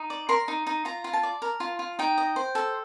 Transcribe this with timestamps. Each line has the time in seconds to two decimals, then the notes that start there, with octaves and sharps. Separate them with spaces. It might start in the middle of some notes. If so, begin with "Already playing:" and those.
Already playing: D#4
0.10 D5
0.29 A#4 C6
0.48 D#4
0.67 D#4
0.85 F4 A#5
1.04 F4
1.13 A5
1.23 D5
1.42 A#4
1.60 F4
1.79 F4
1.99 D#4 G5
2.18 D#5
2.36 C5
2.55 A4